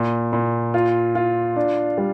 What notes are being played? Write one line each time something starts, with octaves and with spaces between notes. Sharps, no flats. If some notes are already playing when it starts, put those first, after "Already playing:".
Already playing: A#2
A#2
F4
F4
D4
G3